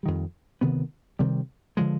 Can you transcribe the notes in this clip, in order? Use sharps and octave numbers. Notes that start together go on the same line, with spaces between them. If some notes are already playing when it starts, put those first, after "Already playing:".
F2 D#3 G3
D2 C3 D#3 B3
C3 D#3 G3 C4
D3 F3 G#3